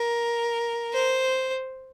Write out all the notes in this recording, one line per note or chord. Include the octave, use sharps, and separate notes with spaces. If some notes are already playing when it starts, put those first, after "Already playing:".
Already playing: A#4
C5